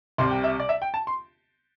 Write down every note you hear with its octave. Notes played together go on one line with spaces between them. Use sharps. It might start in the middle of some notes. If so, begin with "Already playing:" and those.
C2 C3 G3 C6
G5
E5
D5
E5
G5
A5
C6